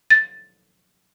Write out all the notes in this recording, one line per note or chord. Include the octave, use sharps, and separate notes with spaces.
A6